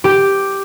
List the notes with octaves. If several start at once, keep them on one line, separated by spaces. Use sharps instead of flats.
G4